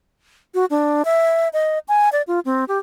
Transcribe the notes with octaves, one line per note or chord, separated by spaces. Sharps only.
F#4
D4
E5
D#5
G#5
D5
F4
C4
G4